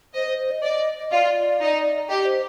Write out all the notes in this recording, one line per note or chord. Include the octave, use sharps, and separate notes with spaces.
C5 D#5
C5
C5
D#5
D5
F4 D5
D#4
G4 D#5
C5